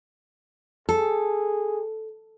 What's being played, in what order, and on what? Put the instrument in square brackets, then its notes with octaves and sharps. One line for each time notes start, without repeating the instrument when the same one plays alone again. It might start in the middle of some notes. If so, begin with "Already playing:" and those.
[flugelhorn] G#4 [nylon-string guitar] A4